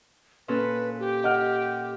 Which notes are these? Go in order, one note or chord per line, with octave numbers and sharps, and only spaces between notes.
A#2 C#4 A4 B4
G4
D#5 F#5 F6